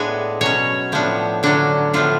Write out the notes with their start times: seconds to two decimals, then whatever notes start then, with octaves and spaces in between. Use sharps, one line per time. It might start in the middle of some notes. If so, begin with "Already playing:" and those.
Already playing: A2 G#3 B3 D4 G#5
0.41 B2 F#3 C#4 C#5
0.92 A2 F3 B3 D4
1.43 D3 F#3 C#4 D4
1.93 A2 F3 B3 D4 F4